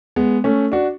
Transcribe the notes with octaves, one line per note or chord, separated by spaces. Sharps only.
G#3 B3
A3 C#4
D4 F#4